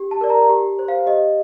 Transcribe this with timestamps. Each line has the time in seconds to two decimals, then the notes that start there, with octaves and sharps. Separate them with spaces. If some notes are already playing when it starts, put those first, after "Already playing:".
Already playing: G4
0.11 A5
0.21 A#4 D5
0.30 A#5
0.49 G4
0.79 C5
0.88 F5
1.07 G4 D#5